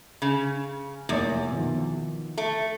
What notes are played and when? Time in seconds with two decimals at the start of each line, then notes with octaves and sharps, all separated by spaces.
0.22 C#3
1.09 F1 E2 A#3 C#5
1.51 B2 D#3 F3
2.38 A3